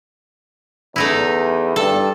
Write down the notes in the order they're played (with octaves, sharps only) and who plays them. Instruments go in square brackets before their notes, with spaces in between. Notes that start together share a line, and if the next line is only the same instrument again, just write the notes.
[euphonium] E2 [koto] A3 D#4 E4
[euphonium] G2 [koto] A4